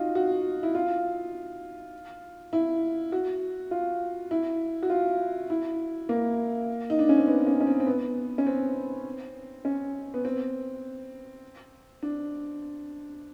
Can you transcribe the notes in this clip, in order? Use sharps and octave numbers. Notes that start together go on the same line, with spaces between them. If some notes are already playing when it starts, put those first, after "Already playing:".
Already playing: D#4 F4 F#4
F#4
E4
F4
E4
F#4
F4
E4
F#4
F4
E4
A#3
D#4
D4
C#4
C4
B3
C#4
C#4
C4
C4
B3
C#4
C4
C#4
B3
C4
D4